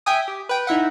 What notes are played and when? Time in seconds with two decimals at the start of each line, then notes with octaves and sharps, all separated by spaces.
0.06 E5 G5 G#5 D#6
0.28 G4
0.49 B4 G5
0.67 D#4 E4 E5 F#5